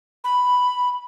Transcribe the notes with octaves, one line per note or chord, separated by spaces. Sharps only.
B5